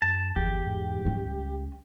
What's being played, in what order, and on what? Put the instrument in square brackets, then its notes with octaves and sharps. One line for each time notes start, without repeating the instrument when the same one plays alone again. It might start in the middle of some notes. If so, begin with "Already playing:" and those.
[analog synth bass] F#2 [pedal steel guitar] A5
[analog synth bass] G1 [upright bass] E2 [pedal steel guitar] G4
[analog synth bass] G#2
[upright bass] G3 C#4
[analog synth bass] C#2